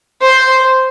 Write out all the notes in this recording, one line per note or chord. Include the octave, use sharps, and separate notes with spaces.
C5